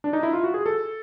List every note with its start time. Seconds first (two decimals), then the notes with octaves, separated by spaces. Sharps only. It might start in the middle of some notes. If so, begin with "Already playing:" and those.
0.04 D4
0.13 D#4
0.23 E4
0.33 F4
0.44 F#4
0.54 G#4
0.66 A4